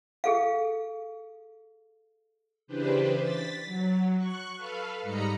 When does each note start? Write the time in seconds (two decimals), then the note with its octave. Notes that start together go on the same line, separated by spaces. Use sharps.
0.24 G#4 A4 F5
2.67 C#3 E3 D4 G4 B4 C5
3.18 A6 B6
3.65 F#3
4.16 C#6 F#6
4.55 A4 B4 F5
5.02 G#2 G3 D#5 A#5 B5 C#7